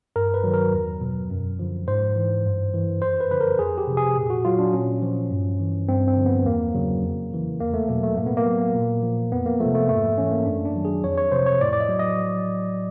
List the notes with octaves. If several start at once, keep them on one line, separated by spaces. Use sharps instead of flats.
G2 A#4
B4
D#3 F#3
A#4
E2
B2 F#3
F#2
D3 F3
G#2 C5
E3
G2
E3
F#2 C5
B4
D3 F3 B4
A#4
F2 G#4
G4
C3 F3
G#4
A#2
F#4
F#3 F4
D4
A#2 C#4
F3
G2
E3
G2 C4
C4
D3 F3
B3
E2 A#3
C#3 F#3
F2
C#3 E3
E2 A#3
A3
B2 F#3 A#3
A3
A2 A#3
B3
A#3
F#3
A#2
F3
F2 B3
A#3
F3 A3
C3
A3
G#2 A3
E3 C#4
A#3
F#2 D4
D4
D#3 F#3
G#4
F2 C#5
C#5
C3 F3 C5
C#5
A2 D5
D5
D#5
F#3
D#5